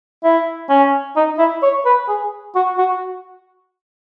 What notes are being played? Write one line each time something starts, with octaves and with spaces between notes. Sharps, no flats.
E4
C#4
D#4
E4
C#5
B4
G#4
F#4
F#4